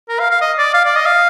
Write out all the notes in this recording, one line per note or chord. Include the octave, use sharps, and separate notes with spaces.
A#4
F5
F5
D#5
D5
F5
D5
D#5
F5